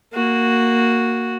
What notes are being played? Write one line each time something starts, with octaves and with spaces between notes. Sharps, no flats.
A#3 F#4